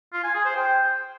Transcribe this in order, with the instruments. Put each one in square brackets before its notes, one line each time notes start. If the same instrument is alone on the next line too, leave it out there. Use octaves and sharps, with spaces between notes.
[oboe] F4
G#5
G#4
C5
G5